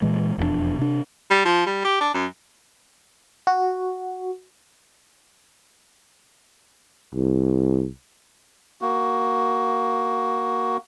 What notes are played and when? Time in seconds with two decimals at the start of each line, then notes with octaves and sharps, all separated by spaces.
0.02 A#2 E3 G#3
0.38 E1 F2 F#3 D4
0.79 C3 D4
1.30 G3
1.45 F3
1.66 G3
1.84 G4
2.00 D4
2.14 F#2
3.47 F#4
7.14 C2
8.81 A#3 F#4